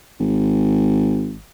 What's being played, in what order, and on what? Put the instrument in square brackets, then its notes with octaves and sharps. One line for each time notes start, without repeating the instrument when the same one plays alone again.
[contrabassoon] G#1